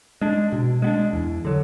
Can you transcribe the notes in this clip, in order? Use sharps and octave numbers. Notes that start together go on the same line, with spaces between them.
G#3 D4
B2
G#3 B3 D4
E2
D3 F#3